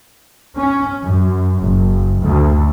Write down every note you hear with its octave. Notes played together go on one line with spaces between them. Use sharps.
C#4
F#2
F#1
D2